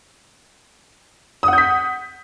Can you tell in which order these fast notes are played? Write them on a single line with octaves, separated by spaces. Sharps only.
D#6 F#5 G6 B6